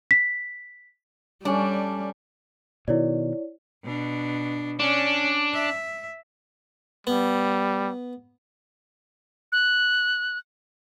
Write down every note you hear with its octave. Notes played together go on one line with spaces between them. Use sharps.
B6
G3 A3 C#4 D4 C#5
B2 D#3 E4 C#5 D5
B2 D4
C#4 D4
E5
G3 B3
F#6